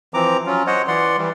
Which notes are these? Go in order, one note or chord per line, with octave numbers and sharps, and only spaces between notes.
E3 F3 C4 A#5 D6
F#3 C#4 F4
C5 C#5 D#5 F#5
E3 D5 F#5 C6
E3 G3